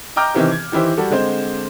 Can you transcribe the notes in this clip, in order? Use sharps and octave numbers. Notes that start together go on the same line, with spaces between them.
D#5 G5 A#5 D6 F6 G6
C3 D#3 E3 C4 G4
G#6
D#3 E3 E4 G4 C5
G3 F#4 A4
D3 G#3 C4 C5